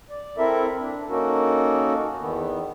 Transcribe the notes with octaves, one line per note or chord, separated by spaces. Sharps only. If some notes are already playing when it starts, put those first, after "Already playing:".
D5
C4 E4 A4 A#4 E5
D4
A#3 C#4 D#4 F#4 A4 A#4
E2 D#3 B3